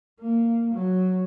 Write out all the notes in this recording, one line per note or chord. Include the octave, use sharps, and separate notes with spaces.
A#3
F#3